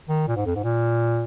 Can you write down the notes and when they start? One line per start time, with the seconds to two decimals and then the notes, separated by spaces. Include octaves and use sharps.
0.09 D#3
0.28 A#2
0.36 G#2
0.46 F2
0.56 G#2
0.64 A#2